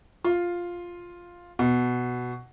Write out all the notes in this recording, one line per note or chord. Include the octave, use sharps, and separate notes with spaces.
F4
B2